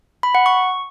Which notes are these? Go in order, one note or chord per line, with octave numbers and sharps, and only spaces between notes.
B5
F#5
C#6